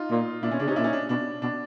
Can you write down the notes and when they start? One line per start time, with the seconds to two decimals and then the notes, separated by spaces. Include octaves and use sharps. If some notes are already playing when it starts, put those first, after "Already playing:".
Already playing: D#4 F4
0.10 A#2
0.42 A#2 D4 E4
0.51 B2 C#4
0.59 C#3 D4
0.67 C3 C#4 D#4
0.76 A#2 D4 E4
0.84 C#4 D#4
0.93 D4
1.09 B2 D4
1.42 B2 D4